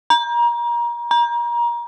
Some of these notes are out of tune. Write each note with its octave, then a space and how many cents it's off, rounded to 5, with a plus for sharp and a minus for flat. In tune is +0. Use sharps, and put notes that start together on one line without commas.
A#5 +30
A#5 +30